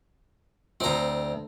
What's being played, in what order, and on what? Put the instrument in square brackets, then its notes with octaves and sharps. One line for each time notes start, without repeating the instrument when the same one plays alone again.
[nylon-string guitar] D2 G#2 [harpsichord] C4 A#5